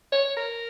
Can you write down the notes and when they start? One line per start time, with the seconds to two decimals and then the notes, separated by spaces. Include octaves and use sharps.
0.12 C#5
0.37 A#4